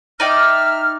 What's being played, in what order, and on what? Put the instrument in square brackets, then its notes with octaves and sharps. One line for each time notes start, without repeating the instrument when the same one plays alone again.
[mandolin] D#4 D5 G5 [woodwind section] E5 F6